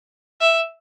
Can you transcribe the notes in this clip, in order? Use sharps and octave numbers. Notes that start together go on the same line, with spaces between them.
E5